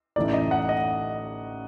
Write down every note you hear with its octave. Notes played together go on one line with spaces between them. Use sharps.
A1 A2 A3 D#4 D5
D#5
F#5
D#5